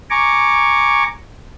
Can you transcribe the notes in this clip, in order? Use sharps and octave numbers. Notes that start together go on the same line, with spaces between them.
G#5 A#5 C#6 D6